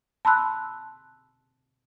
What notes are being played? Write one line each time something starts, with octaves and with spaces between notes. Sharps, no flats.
A5 B5 C6 E6 F#6